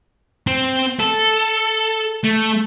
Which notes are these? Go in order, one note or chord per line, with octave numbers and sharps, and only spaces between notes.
C4
A4
A3